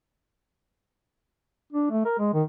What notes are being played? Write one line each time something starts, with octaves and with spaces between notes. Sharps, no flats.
D4
A3
A#4
G#3
D#3